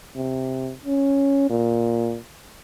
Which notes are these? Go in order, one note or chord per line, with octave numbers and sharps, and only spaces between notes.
C3
C#4
A#2